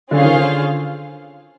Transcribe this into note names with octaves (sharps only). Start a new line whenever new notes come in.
D3 C#4 F4 G#4 C5 F5
D#3
D3